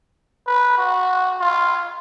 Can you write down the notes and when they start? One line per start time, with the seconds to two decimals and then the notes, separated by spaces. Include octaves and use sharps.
0.47 B4
0.78 F#4
1.41 F4